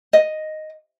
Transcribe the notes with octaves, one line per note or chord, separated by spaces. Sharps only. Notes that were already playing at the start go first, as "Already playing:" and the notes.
D#5